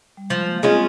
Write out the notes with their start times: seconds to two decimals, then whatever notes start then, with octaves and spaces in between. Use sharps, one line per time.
0.17 G3
0.30 F3 G#3
0.46 A#3
0.63 G#3 C4 C#4 F4